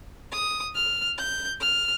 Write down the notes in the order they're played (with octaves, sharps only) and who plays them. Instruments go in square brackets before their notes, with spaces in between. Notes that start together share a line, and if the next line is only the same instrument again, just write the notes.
[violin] D#6
F6
G6
F6